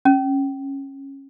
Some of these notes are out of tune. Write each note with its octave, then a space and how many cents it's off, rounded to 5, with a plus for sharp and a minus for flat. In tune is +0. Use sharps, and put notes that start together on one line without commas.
C#4 -15